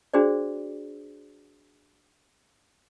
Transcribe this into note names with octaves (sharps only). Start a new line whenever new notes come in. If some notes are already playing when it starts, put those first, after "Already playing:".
D4 F#4 G#4 C5 D5